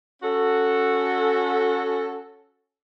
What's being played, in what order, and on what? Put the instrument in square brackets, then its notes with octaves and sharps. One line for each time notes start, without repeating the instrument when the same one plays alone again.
[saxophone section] C#4 F#4 A4